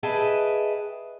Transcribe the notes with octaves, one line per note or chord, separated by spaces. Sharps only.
G#4 B4 D#5 E5 G5 A5